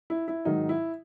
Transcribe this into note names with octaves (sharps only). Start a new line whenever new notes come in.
E4
E4
G#2 D#3 F#3 D#4
E4